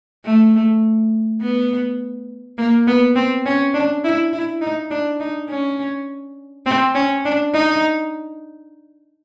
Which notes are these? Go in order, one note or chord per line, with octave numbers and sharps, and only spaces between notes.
A3
B3
A#3
B3
C4
C#4
D4
E4
E4
D#4
D4
D#4
C#4
C4
C#4
D4
D#4